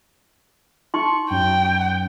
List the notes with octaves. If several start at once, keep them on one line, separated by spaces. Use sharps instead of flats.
D#4 C6 C#6
F#2 G5